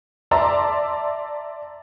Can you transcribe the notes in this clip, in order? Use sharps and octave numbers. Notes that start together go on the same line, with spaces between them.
D5 E5 A5 A#5 C6 E6